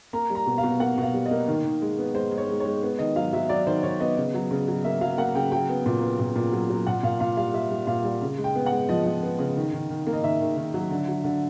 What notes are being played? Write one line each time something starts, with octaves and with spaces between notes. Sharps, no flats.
A#3 A#5
G3
A#5
B2
F5
B2
A#3 F#5
B2
F5
G3
D#5
A#3
D#3
D#3
G#3
B3
G#3 C5
G#3
C#5
G#3
G#3 C#5
B3
D#3 D#5
F#3 F5
F#3 E5
F#3 D5
D#3 C5
D#3 C#5
B3 D#5
C#3
F#3
C#3
F#3
A#3 E5
F#3 F5
A#3 F#5
C#3 G5
F#3 G5
B3
A#2
B3
A#2
A#2
F#3
F#3
A#2 F#5
A#2 F5
A#2 F5
G3 F5
G3 E5
G3
A#2 F5
G3
C#3
G#3
G5
B3
F#5
G#3
F3 D#5
F3
B3
C#3
D#3
D#3
D#3
A#3
D#5
D#3 E5
D#3
D#3
F#3
D3
F#3
D3